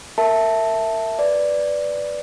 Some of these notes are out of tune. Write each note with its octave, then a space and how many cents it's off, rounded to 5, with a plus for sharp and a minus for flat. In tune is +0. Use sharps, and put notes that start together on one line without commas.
A#4 -25 E5 +0 A5 +0
B4 +0 D5 +0